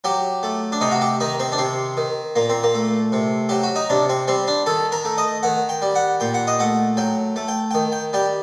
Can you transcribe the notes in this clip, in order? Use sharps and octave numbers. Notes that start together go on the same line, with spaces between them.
F#3 G4
A3
D4
C3 D#4
F#4
G4
D#3 D#4
C4
D4
C3 C4
D#3
A#2 A#3
C4
A#3
A3
C3
F#3 G4
F#4
D#4
C3 D4
C4
G3 C4
D4
D#3 A4
A#4
A3
D#5
D#3 F#5
G5
G3
F#5
A#2 G5
F#5
D#5
A3 F#5
F#3 G5
A3
G5
D#3 G5
G5
G3 G5